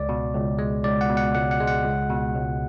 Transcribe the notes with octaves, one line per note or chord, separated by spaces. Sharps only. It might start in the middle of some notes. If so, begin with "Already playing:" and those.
Already playing: C#2 D5
B2
C#2
G#3
C#2 D5
F#5
B2
F#5
C#2 F#5
F#5
G#3
F#5
C#2
B2
C#2